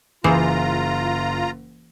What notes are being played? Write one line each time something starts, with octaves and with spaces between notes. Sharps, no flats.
F#1 E3 F4 G#4 C5 A#5